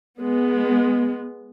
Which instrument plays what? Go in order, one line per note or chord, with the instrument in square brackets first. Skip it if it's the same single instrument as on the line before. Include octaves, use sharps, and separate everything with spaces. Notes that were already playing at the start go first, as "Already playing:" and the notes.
[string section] G#3 B3